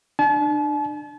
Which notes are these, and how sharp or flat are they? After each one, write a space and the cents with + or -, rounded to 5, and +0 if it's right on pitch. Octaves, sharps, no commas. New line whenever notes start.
D4 +35 A5 -40